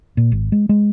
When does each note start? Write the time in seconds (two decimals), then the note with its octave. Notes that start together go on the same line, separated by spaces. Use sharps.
0.17 A#2
0.32 G#1
0.52 G#3
0.69 G#3